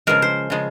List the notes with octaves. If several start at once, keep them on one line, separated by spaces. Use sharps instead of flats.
C#3 F3 G#3 A#4
C5
C#3 F3 G#3